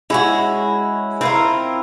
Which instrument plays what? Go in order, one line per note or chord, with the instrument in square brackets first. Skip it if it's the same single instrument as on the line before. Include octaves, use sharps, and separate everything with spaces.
[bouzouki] G#3 C#4 F#4 [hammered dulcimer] E4
[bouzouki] C4 F4 A#4 [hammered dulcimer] E4